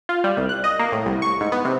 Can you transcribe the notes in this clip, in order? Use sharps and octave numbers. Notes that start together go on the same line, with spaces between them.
F4
G3
C2
F#6
D#5
A#3
A2
C2
C#6
G#2
B3
C3